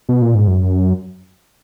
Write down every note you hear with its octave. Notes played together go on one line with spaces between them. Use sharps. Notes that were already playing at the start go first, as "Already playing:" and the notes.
B2
A#2
G#2
F#2